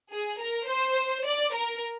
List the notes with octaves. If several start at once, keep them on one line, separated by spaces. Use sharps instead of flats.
G#4
A#4
C5
D5
A#4